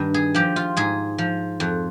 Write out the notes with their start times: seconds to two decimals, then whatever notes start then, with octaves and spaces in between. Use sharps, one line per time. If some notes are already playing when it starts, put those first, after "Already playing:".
Already playing: G2 D#3
0.14 G#4
0.34 F3 G4
0.56 F4
0.77 G#2 G#4
1.18 F3
1.60 F2